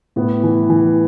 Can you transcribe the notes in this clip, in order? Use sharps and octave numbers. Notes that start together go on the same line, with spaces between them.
A2 B3
E3
E3